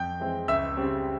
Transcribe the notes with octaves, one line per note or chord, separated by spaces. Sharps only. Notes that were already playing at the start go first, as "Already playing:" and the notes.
Already playing: F2 G5 G6
E3 G#3 C4
C#2 E5 E6
C#3 G3 C4